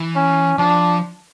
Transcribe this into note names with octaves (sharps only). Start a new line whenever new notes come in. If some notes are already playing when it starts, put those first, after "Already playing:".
Already playing: E3
C#4
F3 D4